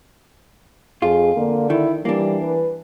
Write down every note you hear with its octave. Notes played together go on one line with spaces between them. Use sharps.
F2 F4 G#4
D3 A#3
D#3 E4
E3 G3 A#3 D4
B4